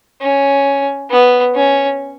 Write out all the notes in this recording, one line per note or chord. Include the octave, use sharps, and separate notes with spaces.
C#4
B3
C#4